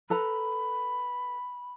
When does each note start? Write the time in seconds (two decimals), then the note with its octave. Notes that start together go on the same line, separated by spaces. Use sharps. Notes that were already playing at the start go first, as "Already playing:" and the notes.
0.10 A4 B4 A#5 B5